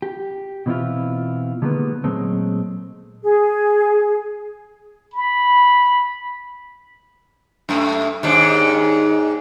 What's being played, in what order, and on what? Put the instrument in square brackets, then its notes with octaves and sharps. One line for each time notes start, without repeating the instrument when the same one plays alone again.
[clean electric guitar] G4
B2 E3 C4 E4 F4
D3 D#3 G3 G#3 A#3 B3
A#2 F#3 G#3 A3 C4
[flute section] G#4
[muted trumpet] B5
[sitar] F#2 A3
D#2 G#2 D4